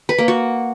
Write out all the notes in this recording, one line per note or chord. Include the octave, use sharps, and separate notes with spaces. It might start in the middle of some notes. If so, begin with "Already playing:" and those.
B4
A#3
F#4